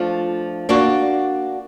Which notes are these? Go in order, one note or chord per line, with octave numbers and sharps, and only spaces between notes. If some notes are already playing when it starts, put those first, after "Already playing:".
Already playing: F3 A3 D4 F4
A#3 D4 F#4